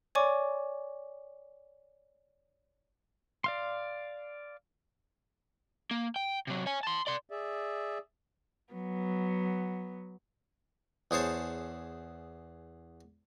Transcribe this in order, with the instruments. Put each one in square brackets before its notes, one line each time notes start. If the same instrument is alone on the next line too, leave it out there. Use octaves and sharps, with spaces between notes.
[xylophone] C#5 D5 G#5 C#6 D6
[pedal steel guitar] D5 F5 C6
[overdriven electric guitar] A#3
G5
C3 F#3
C#5 G#5
A5 C6
D5 C6
[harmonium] G#4 D5 E5
[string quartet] F#3 B3
[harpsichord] E2 G#4 C5 C#5 A5